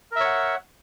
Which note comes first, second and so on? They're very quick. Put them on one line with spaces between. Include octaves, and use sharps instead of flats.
A#4 E5 C#5 F#5